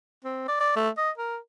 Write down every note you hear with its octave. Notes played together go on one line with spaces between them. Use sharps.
C4
D5
D5
A3
D#5
A#4